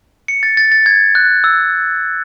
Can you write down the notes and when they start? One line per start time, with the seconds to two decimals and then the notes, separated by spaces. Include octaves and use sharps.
0.28 C#7
0.43 A6
0.57 A6
0.72 A6
0.86 G#6
1.15 F#6
1.44 E6